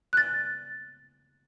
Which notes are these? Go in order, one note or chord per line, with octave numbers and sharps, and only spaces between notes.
F#6 A6